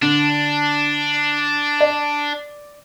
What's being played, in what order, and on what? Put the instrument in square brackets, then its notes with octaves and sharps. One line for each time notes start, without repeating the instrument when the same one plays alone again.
[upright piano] D3 [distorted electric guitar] D4
[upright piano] D5